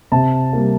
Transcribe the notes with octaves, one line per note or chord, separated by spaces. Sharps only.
C3 A5
G3 A#3